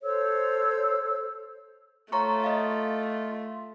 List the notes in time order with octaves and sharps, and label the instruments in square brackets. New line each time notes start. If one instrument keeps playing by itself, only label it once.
[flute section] A4 C5 C#5 E6
[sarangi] A3 [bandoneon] F4 [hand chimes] C#5 A#5 C#6
[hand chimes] D#5 F5